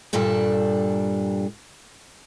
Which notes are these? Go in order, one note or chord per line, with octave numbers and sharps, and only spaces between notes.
G2 A#2 G3 D4 A4